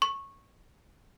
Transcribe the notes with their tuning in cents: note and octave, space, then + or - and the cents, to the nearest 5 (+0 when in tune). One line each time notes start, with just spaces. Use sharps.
C#6 -15